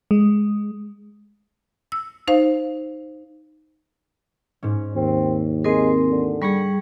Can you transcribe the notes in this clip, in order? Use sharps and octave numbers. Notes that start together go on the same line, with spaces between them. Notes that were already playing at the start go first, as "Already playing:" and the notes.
G#3
E6
D#4 C5 F5
G#2 C#4
D#2 C4
G#3 C4 G#4 A#4 C7
D3
G3 G#4 B5 C#6 C#7